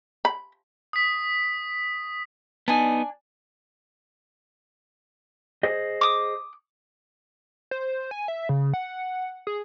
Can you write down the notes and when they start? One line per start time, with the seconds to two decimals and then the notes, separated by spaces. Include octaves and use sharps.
0.25 B5
0.93 D#6 B6
2.68 B3 D4 D#4 G#5
5.63 G#4 C5 D#5
6.01 D6 D#6
7.71 C5
8.11 G#5
8.28 E5
8.49 C#3
8.74 F#5
9.47 G#4